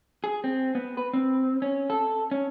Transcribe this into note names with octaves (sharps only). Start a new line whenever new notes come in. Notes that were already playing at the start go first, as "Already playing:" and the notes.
G#4
C4
B3
B4
C4
C#4
A4
C#4